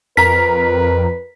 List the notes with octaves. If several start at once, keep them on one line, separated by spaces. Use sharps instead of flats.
F2 A#4 B4 A#5 B6